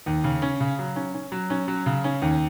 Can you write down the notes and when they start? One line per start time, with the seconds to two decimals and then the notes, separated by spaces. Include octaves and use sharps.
0.06 D#2
0.24 C#3
0.42 C#4
0.60 C#3
0.79 F#3
0.96 C#4
1.14 C#4
1.32 F#3
1.50 C#4
1.68 F#3
1.86 C#3
2.04 C#4
2.22 D#2